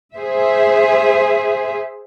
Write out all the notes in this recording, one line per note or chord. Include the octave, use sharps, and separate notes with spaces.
G#4 C5 E5